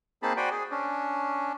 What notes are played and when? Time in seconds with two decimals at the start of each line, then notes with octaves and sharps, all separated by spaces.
0.23 A#3 C4 D#4 G#4 A5 B5
0.37 F#4 C5 D5 G5 G#5 B5
0.51 G#4
0.71 C#4 D4